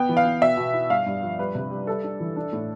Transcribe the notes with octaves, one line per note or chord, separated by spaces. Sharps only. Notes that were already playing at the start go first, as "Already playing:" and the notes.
Already playing: B3 G5
E3
F5
B3
B2 E5
B2
E4
G2 F5
G2
F3
G3 B4
C3
G3
G3 A4
D4
E3
D4
A2